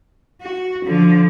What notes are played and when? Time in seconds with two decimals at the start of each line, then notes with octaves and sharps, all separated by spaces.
0.42 F#4
0.85 D3 F3